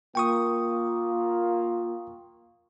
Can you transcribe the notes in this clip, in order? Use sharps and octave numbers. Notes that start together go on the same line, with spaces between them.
A#3 F4 G5 C#6 D#6